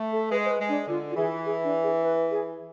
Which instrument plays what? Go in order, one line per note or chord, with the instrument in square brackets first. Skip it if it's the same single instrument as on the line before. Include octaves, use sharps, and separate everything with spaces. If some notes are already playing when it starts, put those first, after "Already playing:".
Already playing: [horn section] A3
[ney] A4
[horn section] G#3 [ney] B4
[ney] C5
B4
[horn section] G#3
[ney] D4
[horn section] D3 [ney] F4
[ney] F4
[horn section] E3 [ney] G#4
[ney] G#4
D4
G#4
B4
G#4